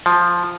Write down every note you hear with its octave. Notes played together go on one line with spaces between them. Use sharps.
F3